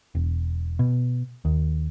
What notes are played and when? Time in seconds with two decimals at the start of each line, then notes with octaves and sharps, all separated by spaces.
0.15 E1
0.79 B2
1.45 D#2